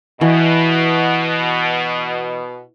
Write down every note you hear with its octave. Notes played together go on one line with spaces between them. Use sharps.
B2 E3